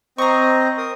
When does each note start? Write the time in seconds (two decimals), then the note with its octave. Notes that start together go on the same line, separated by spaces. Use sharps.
0.18 C4 C5 D#5 A#5 C#6
0.78 A#4 D#6